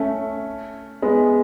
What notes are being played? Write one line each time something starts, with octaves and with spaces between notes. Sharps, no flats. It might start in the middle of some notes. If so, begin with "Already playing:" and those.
Already playing: A3 C#4
G#3 B3